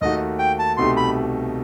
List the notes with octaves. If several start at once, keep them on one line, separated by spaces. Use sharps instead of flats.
D#2 D#3 A3 D#4 F#4 D#5
G5
A5
C2 B2 A3 D#4 G4 C6
B5